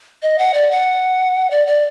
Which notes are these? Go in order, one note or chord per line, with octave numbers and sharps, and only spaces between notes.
D#5
F#5
D5
F#5
D5
D5